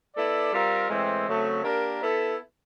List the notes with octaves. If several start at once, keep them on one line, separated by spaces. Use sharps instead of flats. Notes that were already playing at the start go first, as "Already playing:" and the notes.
B3 E4 A4 D5
G3 C4 F4 A#4
A2 E3 G#3 C4
C#3 F#3 A3 C4
A#3 D4 G4 A#4
B3 E4 A4